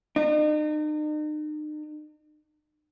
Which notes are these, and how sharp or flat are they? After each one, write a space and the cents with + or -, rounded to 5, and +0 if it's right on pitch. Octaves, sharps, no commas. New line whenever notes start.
D#4 -40